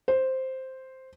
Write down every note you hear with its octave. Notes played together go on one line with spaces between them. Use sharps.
C5